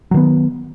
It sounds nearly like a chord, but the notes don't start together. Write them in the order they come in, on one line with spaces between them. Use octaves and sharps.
F#3 D#3 B3